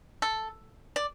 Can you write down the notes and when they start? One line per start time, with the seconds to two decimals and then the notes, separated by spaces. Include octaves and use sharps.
0.22 A4
0.96 D5